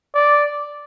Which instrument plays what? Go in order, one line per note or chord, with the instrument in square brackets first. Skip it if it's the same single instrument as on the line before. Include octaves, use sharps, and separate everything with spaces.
[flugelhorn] D5